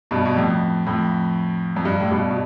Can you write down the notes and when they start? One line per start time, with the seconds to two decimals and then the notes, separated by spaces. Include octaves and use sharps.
0.11 G2 B2
0.25 B2
0.36 F2 A2
0.86 F2 A2
1.76 F2
1.85 G2
2.00 A2
2.11 G2 B2
2.31 B2